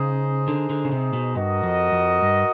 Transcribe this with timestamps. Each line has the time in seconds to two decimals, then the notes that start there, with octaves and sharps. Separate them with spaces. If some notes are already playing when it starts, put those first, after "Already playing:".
Already playing: C#3 D#4 G#4 C5
0.48 D3
0.70 D3
0.85 C#3
0.92 C3
1.13 B2
1.35 G2 F#4 A#4 D#5
1.63 F2
1.92 F2
2.22 G2